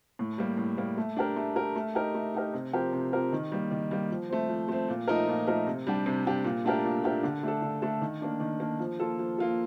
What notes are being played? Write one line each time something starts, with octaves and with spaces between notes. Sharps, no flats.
A2
G3 A#3
A2
G3 A#3
A3
D4 G4 A#4
A3
D4 G4 A#4
A3
D#4 G4 A#4
A3
D#4 G4 A#4
C3
F3 C4 G4 A#4
C3
F3 C4 G4 A#4
D#3
G3 A#3
D#3
G3 A#3
F3
A3 C4
F3
A3 C4
A#2
F3 A3 D#4 A#4
A#2
F3 A3 D#4 A#4
C3
G3 D4 G4
C3
G3 D4 G4
A#2
A3 D4 G4 A#4
A#2
A3 D4 G4 A#4
D3
A3 D4 A4
D3
A3 D4 A4
D#3
A#3 D4
D#3
A#3 D4
F3
A#3 F4 A4
F3
A#3 F4 A4